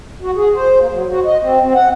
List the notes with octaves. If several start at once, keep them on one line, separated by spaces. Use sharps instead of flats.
F#4
G#4
C5
A#3
F#3
F#4
D#5
C4
C4
F#5